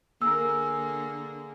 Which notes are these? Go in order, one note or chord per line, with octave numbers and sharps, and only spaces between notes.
D3 A#3 G#4 A#4 E6